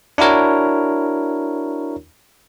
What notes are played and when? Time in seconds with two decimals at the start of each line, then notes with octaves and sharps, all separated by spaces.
0.18 D4 E4 F#4 A#4 C#5